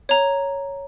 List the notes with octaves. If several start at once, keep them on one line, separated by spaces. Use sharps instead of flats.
C#5 A#5